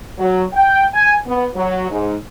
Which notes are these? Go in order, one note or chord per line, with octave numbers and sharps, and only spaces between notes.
F#3
G5
G#5
B3
F#3
G#2